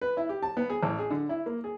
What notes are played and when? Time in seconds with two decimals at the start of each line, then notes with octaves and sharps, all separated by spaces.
0.02 B4
0.17 E4
0.29 G4
0.43 A5
0.57 B3
0.70 G#4
0.83 A1
0.99 G#4
1.11 D3
1.29 E4
1.46 A#3
1.64 G#4